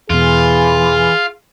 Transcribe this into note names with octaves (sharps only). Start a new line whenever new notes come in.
E2 B2 E3 F4 G#4